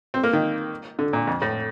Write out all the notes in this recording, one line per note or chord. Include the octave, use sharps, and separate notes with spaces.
C4
A#3
D#3
D3
A#2
F2
A2